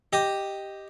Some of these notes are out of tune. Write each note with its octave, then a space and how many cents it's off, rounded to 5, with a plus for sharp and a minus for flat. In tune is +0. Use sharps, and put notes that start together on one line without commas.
G4 +0 D#5 +0